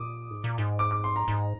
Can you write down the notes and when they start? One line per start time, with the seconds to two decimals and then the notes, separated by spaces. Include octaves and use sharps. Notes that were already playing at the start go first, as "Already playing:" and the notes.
Already playing: A#2 D6 D#6
0.30 G#2
0.44 A#2
0.58 G#2
0.79 D6
0.91 D6
1.04 C6
1.16 A#5
1.28 G#2